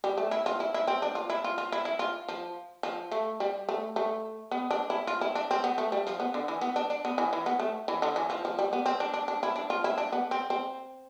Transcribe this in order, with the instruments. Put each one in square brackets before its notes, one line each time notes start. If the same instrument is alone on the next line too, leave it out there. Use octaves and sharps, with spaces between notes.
[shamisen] G3
A3
E4
F4
E4
E4
C4
D4
F4
E4
F4
F4
E4
E4
F4
F3
F3
A3
G3
A3
A3
B3
D4
E4
F4
E4
D4
C4
B3
A3
G3
F3
B3
D3
E3
B3
D4
D4
B3
E3
E3
B3
A3
E3
D3
E3
F3
F3
G3
B3
C4
D4
D4
D4
E4
D4
F4
E4
D4
B3
C4
C4